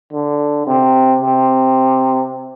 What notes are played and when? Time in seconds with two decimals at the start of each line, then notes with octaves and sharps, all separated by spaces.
0.13 D3
0.67 C3
1.21 C3